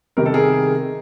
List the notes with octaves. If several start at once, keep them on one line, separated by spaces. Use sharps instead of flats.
C3 D#3 G3 A#4
A4
G#4 A#4